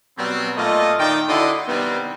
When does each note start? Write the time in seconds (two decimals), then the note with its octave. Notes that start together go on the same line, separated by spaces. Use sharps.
0.18 B2 F#3 G3 B3 C4
0.57 A#2 A3 F4 D#5
0.99 D#3 D#4 D5 G5
1.29 D3 E4 F#4 D5 D#5 C6
1.67 C3 D#3 G3 B3 C4